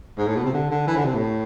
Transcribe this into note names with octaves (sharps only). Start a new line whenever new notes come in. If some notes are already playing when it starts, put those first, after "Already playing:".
G#2
A2
B2
C3
D3
D3
E3
D3
C3
A2